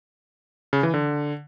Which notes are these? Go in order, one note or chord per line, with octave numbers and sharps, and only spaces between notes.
C#3
E3
D3